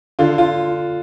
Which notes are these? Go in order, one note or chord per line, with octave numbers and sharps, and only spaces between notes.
D3 F4
F4